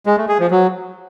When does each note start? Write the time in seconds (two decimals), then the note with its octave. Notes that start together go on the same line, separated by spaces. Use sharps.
0.06 G#3
0.17 A3
0.28 G#4
0.40 F3
0.51 F#3